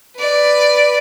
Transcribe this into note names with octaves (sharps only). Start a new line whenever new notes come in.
B4 D5